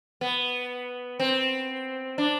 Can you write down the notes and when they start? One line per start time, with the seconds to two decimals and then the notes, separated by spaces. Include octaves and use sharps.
0.21 B3
1.20 C4
2.18 D4